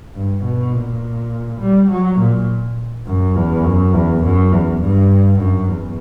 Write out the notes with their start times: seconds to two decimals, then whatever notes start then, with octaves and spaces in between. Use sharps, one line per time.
0.15 G2
0.44 B2
0.73 A#2
1.61 G3
1.91 F#3
2.19 A#2
3.06 F#2
3.36 E2
3.64 F#2
3.94 E2
4.24 F#2
4.52 E2
4.81 G2
5.40 F#2
5.69 E2